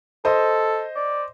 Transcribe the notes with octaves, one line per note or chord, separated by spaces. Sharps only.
A4 C5 D#5
D5